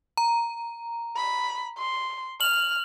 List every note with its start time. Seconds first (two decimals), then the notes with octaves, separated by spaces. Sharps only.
0.17 A#5
1.16 B5
1.78 C6
2.41 F6 F#7